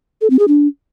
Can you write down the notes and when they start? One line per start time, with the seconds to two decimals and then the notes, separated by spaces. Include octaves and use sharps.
0.21 A4
0.30 C4
0.39 G#4
0.48 D4